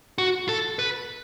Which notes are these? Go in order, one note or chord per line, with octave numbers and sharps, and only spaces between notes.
F#4
A4
B4